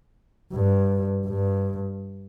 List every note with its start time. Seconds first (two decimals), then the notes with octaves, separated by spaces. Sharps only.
0.53 G2
1.26 G2